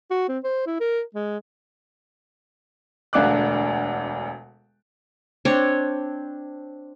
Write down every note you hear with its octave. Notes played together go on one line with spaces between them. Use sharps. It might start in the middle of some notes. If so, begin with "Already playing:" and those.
F#4
C4
C5
E4
A#4
G#3
E1 D2 D4 F5 D6 F#6
C4 D4 C#5